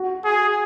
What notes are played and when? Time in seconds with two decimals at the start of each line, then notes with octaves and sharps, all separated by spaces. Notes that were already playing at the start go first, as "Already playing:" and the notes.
Already playing: F#4
0.25 G#4